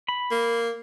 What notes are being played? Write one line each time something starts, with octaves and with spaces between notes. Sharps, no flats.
B5
A#3